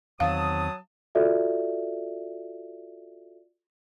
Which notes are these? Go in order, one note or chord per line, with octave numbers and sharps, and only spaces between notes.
E2 D#3 F#3 C4 F5 A5 D#6
F4 F#4 A4 D5 E5